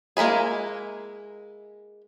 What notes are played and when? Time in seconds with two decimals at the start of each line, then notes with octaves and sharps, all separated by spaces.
0.17 G#3 A#3 D#4 E4 G#4